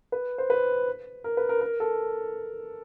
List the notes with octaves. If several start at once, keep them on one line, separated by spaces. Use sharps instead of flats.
B4
C5
B4
A#4
B4
A#4
A#4
A4